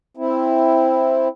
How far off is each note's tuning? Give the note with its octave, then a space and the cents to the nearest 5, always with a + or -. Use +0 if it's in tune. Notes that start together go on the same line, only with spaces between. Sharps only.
C4 +0 E4 +0